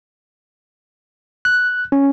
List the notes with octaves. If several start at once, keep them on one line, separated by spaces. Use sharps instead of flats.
F#6
C#4